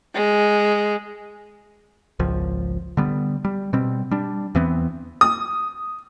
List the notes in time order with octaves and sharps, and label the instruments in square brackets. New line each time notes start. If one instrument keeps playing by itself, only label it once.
[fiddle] G#3
[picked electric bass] G#1 C#2 F3
D3 G3 B3
G3
B2 G3 C4
G3 D4
E2 E3 B3 C4
[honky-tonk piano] D#6